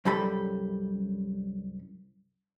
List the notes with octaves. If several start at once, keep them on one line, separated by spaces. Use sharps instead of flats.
C2 F#2 G3 A4 B5